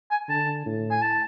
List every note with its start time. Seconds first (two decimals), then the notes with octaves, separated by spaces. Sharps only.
0.11 G#5
0.29 D3 A5
0.66 A2
0.90 G#5
1.02 A5